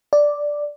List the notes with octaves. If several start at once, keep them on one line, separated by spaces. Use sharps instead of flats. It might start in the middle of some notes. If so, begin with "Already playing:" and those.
D5